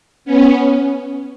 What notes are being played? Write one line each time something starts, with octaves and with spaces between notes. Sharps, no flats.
B3 C#4